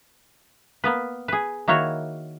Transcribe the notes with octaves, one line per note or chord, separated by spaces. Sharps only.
A#3 B3 B4
G#4 B4
D#3 A#3 E4 F#4 C#5